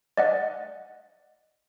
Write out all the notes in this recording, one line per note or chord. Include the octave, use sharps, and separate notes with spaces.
D5 D#5 F#5